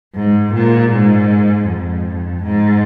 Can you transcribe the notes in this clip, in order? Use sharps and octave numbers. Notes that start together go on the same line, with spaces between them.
G#2
A#2
G#2
F2
G#2